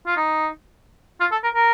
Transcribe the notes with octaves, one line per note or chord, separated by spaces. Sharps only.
F4
D#4
F4
A4
A#4
A#4